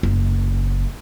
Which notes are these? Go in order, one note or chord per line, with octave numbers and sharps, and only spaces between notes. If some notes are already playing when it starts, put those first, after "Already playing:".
F#1